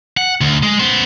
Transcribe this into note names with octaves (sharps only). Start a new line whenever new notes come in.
F#5
D2
G#3
B3 C5